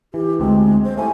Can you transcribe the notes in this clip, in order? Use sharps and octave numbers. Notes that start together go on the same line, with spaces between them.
E3 G4
D2 G#3 C4 G#4
C5
A3 E4 G4 G#5